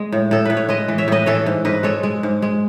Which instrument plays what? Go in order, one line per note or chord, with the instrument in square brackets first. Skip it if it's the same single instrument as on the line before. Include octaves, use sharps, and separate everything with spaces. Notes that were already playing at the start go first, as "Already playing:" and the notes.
Already playing: [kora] G#3 G#4
A2
A2 A4
A2 B4
C#5
G#3 B4 D#5
E3
C#5 E5
A2 B4 D#5
E3 A4 C#5
G#2
G#2 B4 D#5
G#3 A4 C#5
G#3
G#2
G#3